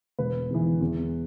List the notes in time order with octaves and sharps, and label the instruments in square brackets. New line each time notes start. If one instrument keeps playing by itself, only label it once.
[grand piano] E1 B4
E2 E3
E2